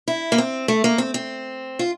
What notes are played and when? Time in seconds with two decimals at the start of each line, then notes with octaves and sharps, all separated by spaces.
0.08 E4
0.32 A#3
0.38 C4
0.68 A3
0.84 A#3
0.98 C4
1.14 C4
1.79 F4